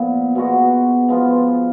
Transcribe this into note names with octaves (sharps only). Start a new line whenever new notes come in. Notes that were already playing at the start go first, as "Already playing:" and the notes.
Already playing: A#2 F3 B3
B2 G#3 B3 F#4
F3 G#3 B3 F4